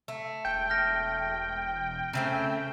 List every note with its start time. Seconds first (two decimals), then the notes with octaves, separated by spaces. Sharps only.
0.08 A3
0.45 E1 G5 G6
0.70 F6 A#6
2.13 C#3 A3 C4